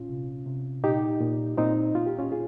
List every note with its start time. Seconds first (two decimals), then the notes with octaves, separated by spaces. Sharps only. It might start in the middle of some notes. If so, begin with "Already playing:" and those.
Already playing: A#2 C#4 F4
0.09 C3
0.46 C3
0.84 A#2 D#4 G4
1.21 A#2
1.57 A#2 C4 D#4
1.95 A#2 F4
2.06 G4
2.19 C#4 F4
2.32 A#2 F4 G#4